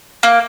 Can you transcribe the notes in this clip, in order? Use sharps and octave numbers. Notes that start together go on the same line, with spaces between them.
A#3